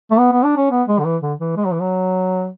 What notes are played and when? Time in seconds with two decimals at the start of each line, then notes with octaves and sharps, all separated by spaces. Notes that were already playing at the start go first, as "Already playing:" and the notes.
0.11 A3
0.19 B3
0.32 B3
0.44 D4
0.57 C#4
0.71 B3
0.88 G#3
0.99 D3
1.05 E3
1.22 D3
1.39 E3
1.56 G#3
1.65 F#3
1.72 E3
1.81 F#3